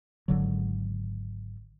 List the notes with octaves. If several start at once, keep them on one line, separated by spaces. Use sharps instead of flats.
G#1 D3 F#3